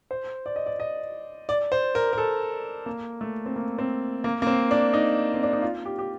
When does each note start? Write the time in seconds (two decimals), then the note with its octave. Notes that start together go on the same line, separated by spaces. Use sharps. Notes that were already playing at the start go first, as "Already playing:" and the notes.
0.11 C5
0.46 D5
0.56 D#5
0.66 D5
0.80 D#5
1.49 D5
1.72 C5
1.95 A#4
2.13 A#4
2.18 A4
2.86 A#3
3.21 A3
3.46 C4
3.56 A#3
3.78 C4
4.24 A#3
4.42 A#3
4.47 C4
4.71 D4
4.93 D#4
5.34 C4
5.43 D4
5.53 D#4
5.62 F4
5.85 G4
5.99 G4